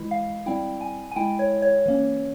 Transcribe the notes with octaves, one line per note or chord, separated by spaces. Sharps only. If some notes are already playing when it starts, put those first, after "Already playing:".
Already playing: E3 G#3 E4
F5
G3 C4 E4 G5
G#5
G#5
G#3 E4 G5
C#5
C#5
E3 A#3 C#4